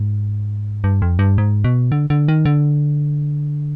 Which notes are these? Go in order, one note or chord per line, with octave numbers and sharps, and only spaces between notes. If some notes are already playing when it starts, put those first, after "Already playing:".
Already playing: G#2
G2
F2
G2
G#2
B2
D3
D3
D#3
D3